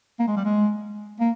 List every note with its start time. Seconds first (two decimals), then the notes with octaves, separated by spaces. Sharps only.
0.19 A#3
0.27 G#3
0.37 G3
0.45 G#3
1.20 A#3